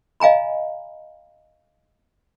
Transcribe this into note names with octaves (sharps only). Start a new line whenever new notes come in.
D#5 F5 G#5 A#5 B5